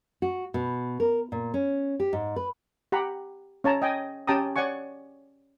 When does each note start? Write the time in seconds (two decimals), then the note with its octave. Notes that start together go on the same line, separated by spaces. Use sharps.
0.22 F#4
0.54 B2
1.00 A#4
1.32 A#2
1.54 C#4
2.00 G4
2.13 G#2
2.36 B4
2.92 G4 F#5 A#5 B5
3.64 C#4 C#5 A5 A#5
3.82 D#5 G5 G#5
4.27 C#4 G4 G5 A5 A#5 D#6
4.56 C#5 D5 F#5 G#5 C#6